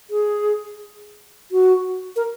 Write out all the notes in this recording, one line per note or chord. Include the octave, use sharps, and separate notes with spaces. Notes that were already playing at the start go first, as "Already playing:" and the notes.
G#4
F#4
A#4